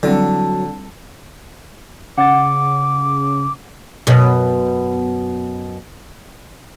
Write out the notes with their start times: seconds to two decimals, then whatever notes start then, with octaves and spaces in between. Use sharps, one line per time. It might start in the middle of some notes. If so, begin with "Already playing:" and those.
0.03 D3 F#3 G3 C4 E4 A4
2.18 C#3 F#5 D6 A6
4.07 F#2 B2